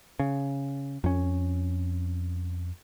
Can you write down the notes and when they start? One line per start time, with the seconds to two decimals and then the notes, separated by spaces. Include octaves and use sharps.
0.19 C#3
1.04 F2 C#4